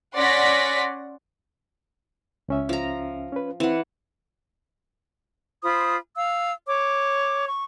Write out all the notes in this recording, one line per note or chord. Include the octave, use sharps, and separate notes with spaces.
C#4 D5 F#5 C6 A#6 B6
C#2 C#4 E5
F3 A#5
C#4 B4
E3 C4 F#5
F4 C5 B5 D#6
F5 E6
C#5 D6
C#6